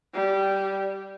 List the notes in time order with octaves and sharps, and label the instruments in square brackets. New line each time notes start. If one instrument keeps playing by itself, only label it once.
[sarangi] G3